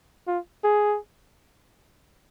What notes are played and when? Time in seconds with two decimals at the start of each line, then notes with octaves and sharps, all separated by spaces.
0.27 F4
0.64 G#4